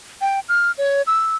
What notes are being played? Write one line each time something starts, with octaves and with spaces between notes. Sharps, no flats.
G5
F6
C#5
E6